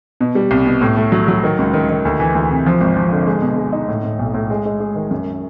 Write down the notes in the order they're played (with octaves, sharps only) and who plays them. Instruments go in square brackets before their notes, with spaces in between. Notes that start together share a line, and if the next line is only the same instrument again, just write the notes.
[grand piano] B2
G3
C2
B2
A2
A3
F#3
F#3
D#3
C#2
D#3
D#3
D2
E3
D2
C3
F3
G#1
F3
D3
G#3
B2
G#3
D#4
A2
A2
B1
A2
G#3
G#3
G#3
D#3
F#2